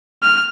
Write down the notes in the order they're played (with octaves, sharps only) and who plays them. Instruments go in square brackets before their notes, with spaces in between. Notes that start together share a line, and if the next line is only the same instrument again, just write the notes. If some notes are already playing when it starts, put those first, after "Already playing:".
[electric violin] F6